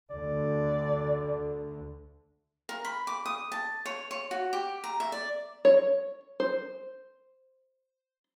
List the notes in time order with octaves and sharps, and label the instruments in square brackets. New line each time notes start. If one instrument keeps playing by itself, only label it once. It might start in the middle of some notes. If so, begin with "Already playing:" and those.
[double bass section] D2 D3 [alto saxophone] D5
[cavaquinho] A#4
B5
D6
D#6
A5
C#5
C#5
F#4
G4
A#5
E5
D5
[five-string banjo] C#5
C5